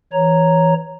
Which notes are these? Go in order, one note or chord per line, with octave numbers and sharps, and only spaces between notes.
E3 C#5 A#5